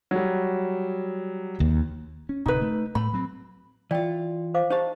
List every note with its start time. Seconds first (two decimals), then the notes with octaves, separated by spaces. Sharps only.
0.11 F#3 G3
1.60 D#2
2.29 C#4
2.46 D1 C3 D#4 B4
2.61 A3
2.95 A2 A3 B5
3.13 F#3 C4
3.91 E3 F4 D5 G5
4.54 C5 F5 D6
4.70 D#4 G4 C5 F5 A5